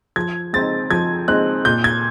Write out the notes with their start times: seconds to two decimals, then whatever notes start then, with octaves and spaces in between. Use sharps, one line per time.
0.16 F3 G#6
0.53 G#3 C4 D#4 A6
0.90 F3 G#6
1.28 G#3 C4 D#4 F#6
1.65 A#2 G6
1.84 G#6